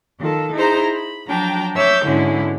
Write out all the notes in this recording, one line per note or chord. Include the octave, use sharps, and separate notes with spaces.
D#3 F4 A4
D#4 E4 G#4 C5 A#5
B5
F3 F#3 D4 G5 A#5
C#5 E5 D6 E6 G6
G#2 B2 D3 G#3 C#4 E4